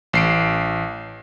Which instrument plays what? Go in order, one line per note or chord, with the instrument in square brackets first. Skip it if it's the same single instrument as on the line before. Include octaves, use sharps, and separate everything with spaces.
[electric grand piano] A1 C7 D7